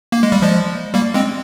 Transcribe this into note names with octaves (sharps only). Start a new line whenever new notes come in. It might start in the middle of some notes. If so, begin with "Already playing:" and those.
A#3
G#3
G3
F3 G#3
G3 A#3
G#3 C4